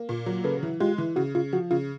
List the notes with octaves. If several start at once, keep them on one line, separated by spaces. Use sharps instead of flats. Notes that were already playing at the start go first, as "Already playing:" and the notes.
Already playing: A#3
A#2
F#3
C#3 A4 B4
E3
G#3 F4 G4
E3
C#3 F#4
C#3 F4
F3 F#4
C#3 F4